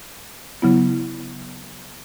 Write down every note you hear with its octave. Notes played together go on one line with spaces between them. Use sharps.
C#3 F#3 B3 E4